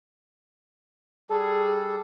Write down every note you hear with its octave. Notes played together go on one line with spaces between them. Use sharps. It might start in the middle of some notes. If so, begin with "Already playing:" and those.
G3 D4 G#4 A4